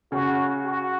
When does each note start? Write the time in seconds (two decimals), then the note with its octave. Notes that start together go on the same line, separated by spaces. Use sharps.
0.12 C#3 C#4 F#4
0.65 F#4